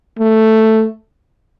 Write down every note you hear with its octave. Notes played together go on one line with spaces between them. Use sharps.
A3